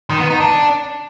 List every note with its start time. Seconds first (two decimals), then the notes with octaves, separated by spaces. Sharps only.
0.10 D#3
0.20 B3
0.30 D#4
0.40 D4